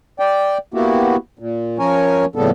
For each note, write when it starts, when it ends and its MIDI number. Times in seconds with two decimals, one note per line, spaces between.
0.20 0.58 74
0.20 0.58 79
0.74 1.16 58
0.74 1.16 59
0.74 1.16 64
0.74 1.16 66
0.74 1.16 67
1.39 1.78 46
1.79 2.25 53
1.79 2.25 61
1.79 2.25 70
1.79 2.25 73
1.79 2.25 80
2.35 2.51 41
2.35 2.51 45
2.35 2.51 49
2.35 2.51 55
2.35 2.51 59
2.35 2.51 69